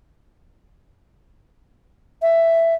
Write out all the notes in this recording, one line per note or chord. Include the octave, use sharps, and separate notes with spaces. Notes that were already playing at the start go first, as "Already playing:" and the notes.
E5